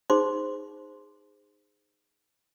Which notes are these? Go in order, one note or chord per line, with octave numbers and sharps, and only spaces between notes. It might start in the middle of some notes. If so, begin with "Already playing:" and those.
D#4 G#4 C5 C6 D6